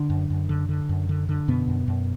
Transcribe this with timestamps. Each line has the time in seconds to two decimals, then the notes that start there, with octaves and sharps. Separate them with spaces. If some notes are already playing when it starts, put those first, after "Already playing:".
Already playing: D3 D4
0.10 F#2
0.30 F#2
0.49 D3
0.69 D3
0.89 F#2
1.09 D3
1.29 D3
1.48 F#2 B2 B3
1.68 F#2
1.88 F#2